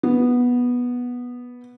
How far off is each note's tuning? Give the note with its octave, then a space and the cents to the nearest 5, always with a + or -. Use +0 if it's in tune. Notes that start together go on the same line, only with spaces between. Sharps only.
B3 -10